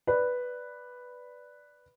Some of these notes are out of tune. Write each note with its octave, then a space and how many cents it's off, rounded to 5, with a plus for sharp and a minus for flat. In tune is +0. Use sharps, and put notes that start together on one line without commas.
B4 +0 D5 +0